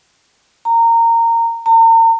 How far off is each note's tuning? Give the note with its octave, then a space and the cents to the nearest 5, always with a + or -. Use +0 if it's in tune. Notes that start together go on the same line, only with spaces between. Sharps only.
A#5 -20
A#5 -40